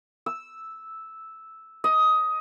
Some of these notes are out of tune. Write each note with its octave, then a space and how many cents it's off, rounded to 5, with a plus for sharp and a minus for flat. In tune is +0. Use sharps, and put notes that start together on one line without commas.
E6 -5
D#5 +15